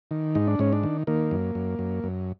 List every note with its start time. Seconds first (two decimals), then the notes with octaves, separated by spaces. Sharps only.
0.11 D#3
0.35 G#2 D#4
0.47 D4
0.59 G#2 C#4
0.73 D4
0.83 D#3
1.07 D#3 A#3
1.31 F#2
1.55 F#2
1.79 F#2
2.04 F#2